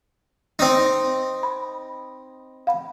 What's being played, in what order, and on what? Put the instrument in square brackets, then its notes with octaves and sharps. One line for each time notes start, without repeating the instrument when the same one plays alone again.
[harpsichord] C4 D#4
[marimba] B5
F5 F#5 B5